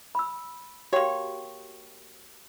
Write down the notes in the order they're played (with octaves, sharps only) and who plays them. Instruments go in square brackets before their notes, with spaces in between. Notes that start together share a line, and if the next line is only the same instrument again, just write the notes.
[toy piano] B5 E6
[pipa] A#3 C#5 [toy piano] F#4 G4 G5